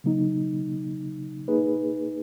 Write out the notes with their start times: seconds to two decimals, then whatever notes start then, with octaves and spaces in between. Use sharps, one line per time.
0.04 C#3 F#3 A#3 D#4
1.48 A#3 D#4 G#4 B4